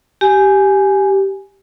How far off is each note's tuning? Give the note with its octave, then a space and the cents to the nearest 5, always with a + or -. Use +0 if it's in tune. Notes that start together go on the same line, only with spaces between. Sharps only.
G4 -10 G#5 +0